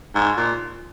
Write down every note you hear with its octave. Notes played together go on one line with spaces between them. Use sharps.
G#2
A#2